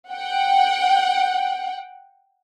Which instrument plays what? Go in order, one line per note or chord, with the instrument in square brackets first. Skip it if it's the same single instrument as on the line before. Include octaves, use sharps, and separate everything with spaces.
[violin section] F#5 G5